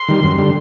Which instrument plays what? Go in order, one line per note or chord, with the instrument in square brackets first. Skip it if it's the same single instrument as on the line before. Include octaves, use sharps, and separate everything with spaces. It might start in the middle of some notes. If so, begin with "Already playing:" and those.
Already playing: [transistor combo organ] C6
D#3 G3
F#2
D3 G3